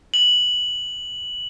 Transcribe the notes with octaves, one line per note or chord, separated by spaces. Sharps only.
F#7